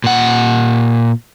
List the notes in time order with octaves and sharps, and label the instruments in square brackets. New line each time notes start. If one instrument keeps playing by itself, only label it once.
[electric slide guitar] A#2 F#5